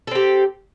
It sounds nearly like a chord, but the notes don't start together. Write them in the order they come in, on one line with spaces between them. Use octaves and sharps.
A4 C4 G4